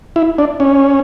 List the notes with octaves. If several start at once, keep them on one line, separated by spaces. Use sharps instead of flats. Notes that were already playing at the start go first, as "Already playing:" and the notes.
E4
D4
C#4